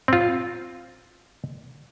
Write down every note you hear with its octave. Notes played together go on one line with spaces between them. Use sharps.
C4 F4